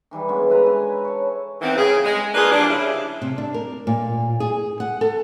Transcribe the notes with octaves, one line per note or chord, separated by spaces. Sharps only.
D#3 E3 G3 E4
D3 G#3 B3 C#4
E4 B4 A#5 B5
G#5
C#5 A5
D#3 E3 B3 C4
C#3 G#4
G#3
A#3 D4 F4 G#4 B4
F3 G3 D4
C#3 E4
C3
D4
A#4
A#2
G#4
F#5
A4